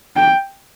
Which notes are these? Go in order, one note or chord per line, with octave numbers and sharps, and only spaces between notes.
G5